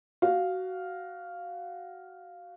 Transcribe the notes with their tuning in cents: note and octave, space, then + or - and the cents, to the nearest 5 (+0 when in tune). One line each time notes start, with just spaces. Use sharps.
F#4 +15 F5 +0